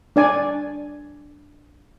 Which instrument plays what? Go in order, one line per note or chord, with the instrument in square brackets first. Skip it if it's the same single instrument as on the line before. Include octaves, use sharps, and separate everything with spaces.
[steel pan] D4 D5 G#5